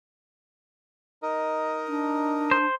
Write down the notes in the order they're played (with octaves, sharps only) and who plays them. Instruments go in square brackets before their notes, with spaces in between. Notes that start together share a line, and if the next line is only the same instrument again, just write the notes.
[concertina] D#4 A#4 D#5
[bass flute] D4
[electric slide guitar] C5